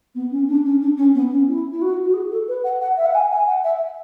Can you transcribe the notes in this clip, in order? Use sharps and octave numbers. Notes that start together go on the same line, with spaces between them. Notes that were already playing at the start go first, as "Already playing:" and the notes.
B3
C#4
D4
C#4
D4
C#4
B3
C#4
E4
E4
F#4
F#4
G#4
A4
B4
F#5
F#5
E5
F#5
G#5
G#5
F#5
E5